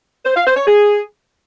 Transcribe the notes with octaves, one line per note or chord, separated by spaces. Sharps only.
C5
F5
C5
C#5
G#4